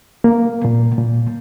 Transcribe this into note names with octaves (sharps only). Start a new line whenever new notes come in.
A#3
A#2
A#2